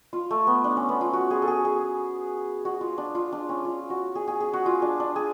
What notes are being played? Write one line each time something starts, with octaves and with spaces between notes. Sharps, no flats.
F4
A3
B3
D4
C#4
B3
F4
F#4
G#4
A4
G#4
G#4
F#4
F4
D4
F4
D4
C#4
F4
F#4
G#4
G#4
G#4
F#4
F4
D4
D4
G#4